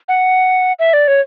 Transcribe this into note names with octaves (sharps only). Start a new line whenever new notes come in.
F#5
E5
D5
C#5